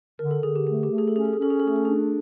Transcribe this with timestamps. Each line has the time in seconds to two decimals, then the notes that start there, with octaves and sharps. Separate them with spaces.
0.19 D3 A#4
0.31 A4
0.43 D3 G#4
0.55 G4
0.67 A3 G#4
0.83 G4
0.90 A3
0.98 G#4
1.08 A4
1.14 C#4 G#4
1.25 A4
1.33 G#4
1.38 C#4 A4
1.50 G#4
1.60 A3 A4
1.67 G#4
1.76 A4
1.85 D4 G#4